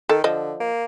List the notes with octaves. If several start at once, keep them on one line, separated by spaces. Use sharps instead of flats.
D#3 A4
D3 F3 D#5
A#3